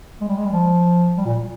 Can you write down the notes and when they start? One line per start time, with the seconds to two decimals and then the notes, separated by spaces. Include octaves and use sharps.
0.21 G#3
0.28 G3
0.37 G#3
0.45 G3
0.53 F3
1.17 G3
1.25 A#2